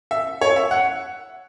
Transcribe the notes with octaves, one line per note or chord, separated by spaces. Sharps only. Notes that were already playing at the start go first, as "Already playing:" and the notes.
E5
C#5
E5
F#5